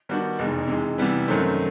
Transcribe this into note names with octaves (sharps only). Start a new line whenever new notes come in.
D#3 G3 B3 D4 F#4
F1 E2 B2 G#3
C3 E3 G#3
C3 E3 G3 B3
F#2 D#3 F#3 A3 C4